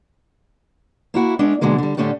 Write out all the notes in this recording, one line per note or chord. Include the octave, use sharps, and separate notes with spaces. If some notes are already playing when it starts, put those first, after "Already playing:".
A#3 E4 F#4
G#3 B3 C#4 D4
B2 D3 F#3 G#3 A#3
D3 G3
A2 D3 A3 C#4 D4 G4